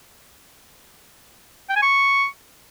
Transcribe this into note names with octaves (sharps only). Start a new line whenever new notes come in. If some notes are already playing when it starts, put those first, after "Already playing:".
G5
G#5
C#6